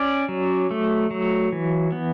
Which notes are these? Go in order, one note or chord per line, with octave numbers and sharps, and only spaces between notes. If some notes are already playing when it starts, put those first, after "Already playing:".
Already playing: C#4 D5
F#3
A3
F#3
E3
B3